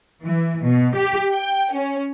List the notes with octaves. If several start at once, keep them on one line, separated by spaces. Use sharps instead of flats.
E3
B2
G4
G5
C#4